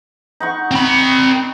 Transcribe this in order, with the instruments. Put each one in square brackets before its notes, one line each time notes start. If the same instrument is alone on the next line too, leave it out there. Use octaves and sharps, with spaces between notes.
[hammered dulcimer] D#4 F#5 C#6
[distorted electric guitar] C4 B5